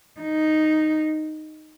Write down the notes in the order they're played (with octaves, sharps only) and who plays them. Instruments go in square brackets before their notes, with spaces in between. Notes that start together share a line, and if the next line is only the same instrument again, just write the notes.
[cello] D#4